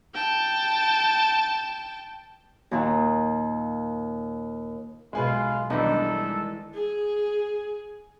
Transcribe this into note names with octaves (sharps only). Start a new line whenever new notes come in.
G5 A5
D#2 A#2
B1 G#3 F4 G#4 B4
B1 D#3 E3 G3 G#3 D4 D#4 A4
G#4